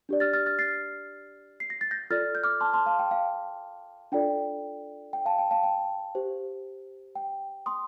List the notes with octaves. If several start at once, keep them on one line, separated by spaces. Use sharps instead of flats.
D4 G4 D5
F6 A6
F6 A6
F6 A6
A6 C7
C7
A#6
A6
G6 A#6
F4 A4 D5 F6 A6
G6
D6 F6
A5 C6
A5 C6
F5 A5
G5
F5
D4 F4 A4 D5 G5
G5
F5 A5
G5
F5 A5
G5
G4 C5
G5
C6 D#6